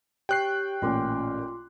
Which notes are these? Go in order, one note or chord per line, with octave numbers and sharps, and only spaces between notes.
G4 C#5 G5 C#6 F#6 C7
A1 A#2 C#4 F4 C6 D6